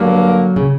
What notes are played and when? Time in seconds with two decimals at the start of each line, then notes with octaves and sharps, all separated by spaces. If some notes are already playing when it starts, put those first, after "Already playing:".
Already playing: G2 D3 F#3 A#3
0.56 C#3